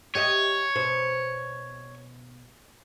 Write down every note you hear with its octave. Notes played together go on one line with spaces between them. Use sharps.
G4 C#5 D#5 E5
B2 C5